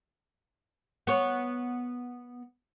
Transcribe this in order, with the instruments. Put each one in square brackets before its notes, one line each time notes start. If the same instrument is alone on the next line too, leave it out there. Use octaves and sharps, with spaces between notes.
[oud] B3 C#5